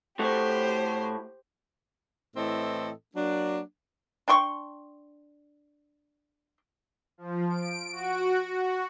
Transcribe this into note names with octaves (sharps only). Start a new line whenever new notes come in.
A2 A3 F#4 G4 C5
A2 E3 C4 A4 D#5
F#3 A#3 D4
D4 G5 C6 C#6
F3
D7
F#4
F#4